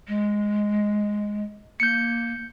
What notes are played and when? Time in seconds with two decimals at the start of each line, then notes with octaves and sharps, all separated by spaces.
0.08 G#3
1.80 A#3 G6 C#7